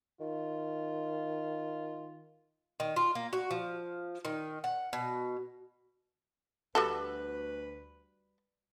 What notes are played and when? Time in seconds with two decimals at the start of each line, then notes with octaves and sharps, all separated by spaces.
0.20 D#3 F4
2.80 D#3
2.96 F4
3.15 A#3
3.33 F#4
3.51 F3
4.25 D#3
4.64 F#5
4.93 B2
6.75 D2 G3 F#4 A4 B4